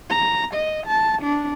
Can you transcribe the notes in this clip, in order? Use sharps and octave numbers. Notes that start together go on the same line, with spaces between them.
A#5
D#5
A5
D4